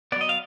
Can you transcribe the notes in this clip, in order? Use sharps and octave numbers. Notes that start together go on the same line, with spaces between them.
F#3 B3 D5 D#5
F5